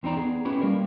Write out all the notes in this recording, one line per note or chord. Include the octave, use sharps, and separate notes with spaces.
E2 C4 D#4 D5 A#5
B3 G#4
A3 C#4 E4 G4 B4
G3 A#3 A#4 D5